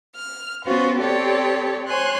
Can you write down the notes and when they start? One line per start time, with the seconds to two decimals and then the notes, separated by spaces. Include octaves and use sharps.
0.14 F6
0.64 B3 C#4 F4 F#4 C5
0.98 C4 G4 A4 C#5 D5
1.86 C5 C#5 G#5 C6 F#6